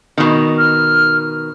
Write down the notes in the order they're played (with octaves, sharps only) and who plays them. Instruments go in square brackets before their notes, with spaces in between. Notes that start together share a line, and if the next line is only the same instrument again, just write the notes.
[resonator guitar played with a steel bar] B2 D#3
[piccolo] F6